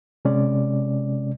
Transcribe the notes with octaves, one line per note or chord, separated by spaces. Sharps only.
C3 G#3 C#4 D5